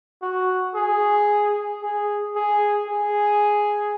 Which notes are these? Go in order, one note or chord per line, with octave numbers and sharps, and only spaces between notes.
F#4
G#4
G#4
G#4
G#4